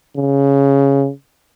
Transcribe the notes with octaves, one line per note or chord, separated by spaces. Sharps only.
C#3